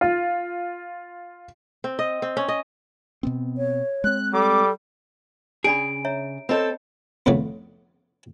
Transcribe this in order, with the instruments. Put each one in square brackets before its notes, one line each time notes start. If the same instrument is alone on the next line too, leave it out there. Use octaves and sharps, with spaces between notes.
[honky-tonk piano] F4
[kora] C4
D#5
C4
C#4
D#5
[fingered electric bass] B2 B3 C4
[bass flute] C#5
[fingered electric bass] G#3 C4 [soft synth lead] F#6
[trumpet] G3 [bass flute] A4 [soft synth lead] D6
[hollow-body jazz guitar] C#3 G#4 [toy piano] D4 D5 B5 [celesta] D7
[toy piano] C#5 E5 A#5
[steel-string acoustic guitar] C4 A4 [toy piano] C#5 D#5 B5
[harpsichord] F2 A2 C#3 B3 D5